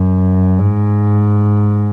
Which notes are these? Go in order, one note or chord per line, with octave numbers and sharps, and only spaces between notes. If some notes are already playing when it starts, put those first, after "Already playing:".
Already playing: F#2
G#2